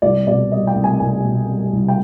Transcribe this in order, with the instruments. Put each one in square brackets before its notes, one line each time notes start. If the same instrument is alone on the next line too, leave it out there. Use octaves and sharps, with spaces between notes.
[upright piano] C2 D5
B2 D5
G3 D#5
G5
C2
G#5
C2 G#5
B2
G3
C2
G5